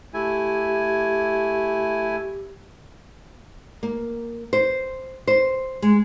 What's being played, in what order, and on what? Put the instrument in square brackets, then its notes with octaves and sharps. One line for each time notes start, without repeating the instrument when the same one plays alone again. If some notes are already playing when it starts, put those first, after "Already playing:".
[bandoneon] A3 E4 G#5 [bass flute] G4
[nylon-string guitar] A#3
C5
C5
G#3